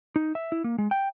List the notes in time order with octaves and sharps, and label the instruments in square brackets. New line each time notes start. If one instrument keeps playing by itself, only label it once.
[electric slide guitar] D#4
E5
E4
A#3
G#3
G5